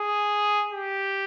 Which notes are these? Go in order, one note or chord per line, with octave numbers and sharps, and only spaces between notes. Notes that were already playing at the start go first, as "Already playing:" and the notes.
Already playing: G#4
G4